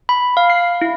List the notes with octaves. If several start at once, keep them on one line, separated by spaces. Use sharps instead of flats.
B5
F5
C7
E4